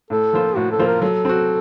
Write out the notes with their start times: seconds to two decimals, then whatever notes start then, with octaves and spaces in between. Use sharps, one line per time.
0.10 A2 A4
0.33 F3 A#3 F4 C5
0.56 A2 F#4
0.72 A4
0.79 F3 A#3 F4 C5
0.87 A#4
1.02 F#3 A4
1.25 C4 F#4